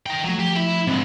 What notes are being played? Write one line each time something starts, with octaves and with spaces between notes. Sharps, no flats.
A#4 G5
F3 F#3 A3
G4
E4
G#2 D3 C4